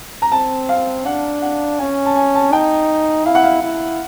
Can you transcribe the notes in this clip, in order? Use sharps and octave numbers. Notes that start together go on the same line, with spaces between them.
A#5
C4 A5
F5
D4 F#5
F#5
C#4 G#5
A5
G#5
A5
D#4 G5
E4 F5
F#5
F5
E4